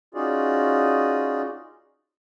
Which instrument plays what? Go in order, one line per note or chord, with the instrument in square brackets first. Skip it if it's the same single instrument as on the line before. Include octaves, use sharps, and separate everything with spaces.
[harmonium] C#4 D#4 F4 F#4 G#4 D5